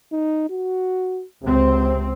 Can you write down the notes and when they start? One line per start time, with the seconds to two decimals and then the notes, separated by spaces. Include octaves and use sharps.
0.12 D#4
0.50 F#4
1.43 C#2 C3 C4